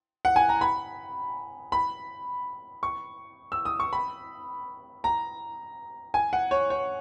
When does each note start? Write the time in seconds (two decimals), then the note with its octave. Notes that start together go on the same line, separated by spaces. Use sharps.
0.25 F#5
0.36 G#5
0.49 A#5
0.61 B5
1.72 B5
2.83 C#6
3.52 E6
3.65 D#6
3.80 C#6
3.93 B5
5.04 A#5
6.14 G#5
6.33 F#5
6.51 C#5
6.70 C#5